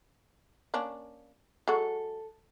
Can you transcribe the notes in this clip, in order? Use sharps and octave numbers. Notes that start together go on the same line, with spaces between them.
A#3 C#4 D4
F#3 G#3 F#4 A4